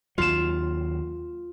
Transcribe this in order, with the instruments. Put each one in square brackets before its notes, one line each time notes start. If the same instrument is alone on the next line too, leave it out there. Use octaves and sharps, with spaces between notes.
[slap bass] D#2 F#3 [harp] F4 E7